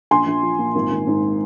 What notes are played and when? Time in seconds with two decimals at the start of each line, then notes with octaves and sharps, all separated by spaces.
0.11 A#1 G#5 C6
0.26 A#1
0.43 F3
0.59 A#2
0.75 G#1
0.91 G#1
1.07 G#2